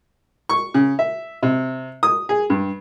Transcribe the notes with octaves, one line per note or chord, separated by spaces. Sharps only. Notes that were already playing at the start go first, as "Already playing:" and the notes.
C#6
C#3
E5
C3
D#6
G#4
G2